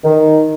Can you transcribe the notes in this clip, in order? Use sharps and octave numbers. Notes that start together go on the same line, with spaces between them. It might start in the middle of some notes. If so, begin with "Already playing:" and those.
D#3